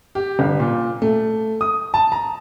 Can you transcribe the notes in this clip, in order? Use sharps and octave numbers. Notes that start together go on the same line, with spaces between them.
G4
G1
A#2
A3
D#6
A5
A#5